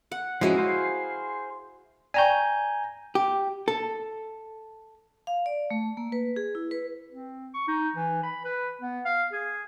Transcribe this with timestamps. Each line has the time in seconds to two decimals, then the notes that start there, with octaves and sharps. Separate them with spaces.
0.12 F#5
0.41 F3 G#3 C#4 E4 F#4 D#5
0.58 G#4 C5 F5
2.14 D5 G5 G#5 A#5 C#6 G6
3.15 G4
3.68 A4
5.27 F5
5.46 D5
5.70 A3
5.97 A#3
6.12 B4
6.36 G#4
6.55 E4
6.71 B4
7.10 C4
7.54 C#6
7.68 D#4
7.96 E3
8.23 B5
8.45 B4
8.82 B3
9.05 F5
9.33 G#4